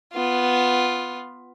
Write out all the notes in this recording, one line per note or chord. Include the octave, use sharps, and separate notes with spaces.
B3 F4